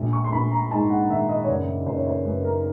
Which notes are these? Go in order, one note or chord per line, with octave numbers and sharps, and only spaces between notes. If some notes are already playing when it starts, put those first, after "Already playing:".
Already playing: A#1
C#6
C6
A#1 B5
A#5
G#2 A5
F#5
D#3 E5
D#5
C#5
F#1 D5
F#1 C5
C#5
C5
F#2 B4
A#4